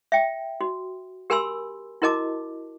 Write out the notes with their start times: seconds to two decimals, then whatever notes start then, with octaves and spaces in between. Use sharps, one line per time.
0.12 E5 G5
0.61 F#4
1.30 G4 A#4 G#5 B5 C6 E6
2.02 E4 F#4 A#4 D#5 A5 D6